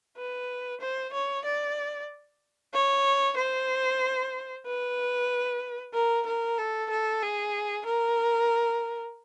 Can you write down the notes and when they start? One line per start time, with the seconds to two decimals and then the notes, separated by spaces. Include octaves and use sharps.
0.17 B4
0.81 C5
1.13 C#5
1.45 D5
2.74 C#5
3.37 C5
4.66 B4
5.94 A#4
6.26 A#4
6.58 A4
6.90 A4
7.22 G#4
7.85 A#4